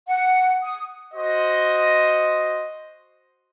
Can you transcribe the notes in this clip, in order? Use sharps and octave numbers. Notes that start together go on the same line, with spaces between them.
F#5
D#6
F#4 C5 D#5